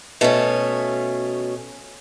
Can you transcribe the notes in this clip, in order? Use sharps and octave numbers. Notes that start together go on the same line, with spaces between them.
B2 A3 C#4